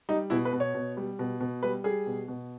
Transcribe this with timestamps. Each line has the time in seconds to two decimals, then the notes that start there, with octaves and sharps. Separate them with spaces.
0.09 G3 D#4
0.30 B2 E4
0.45 B4
0.53 B2
0.60 C#5
0.74 B2
0.97 G3
1.19 B2
1.40 B2
1.63 G3 B4
1.84 G3 G#4
2.06 B2
2.28 B2